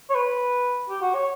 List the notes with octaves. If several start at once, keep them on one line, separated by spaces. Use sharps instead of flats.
C#5
B4
G4
F#4
C#5